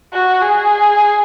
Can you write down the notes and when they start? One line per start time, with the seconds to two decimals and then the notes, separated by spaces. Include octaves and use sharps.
0.13 F#4
0.42 G#4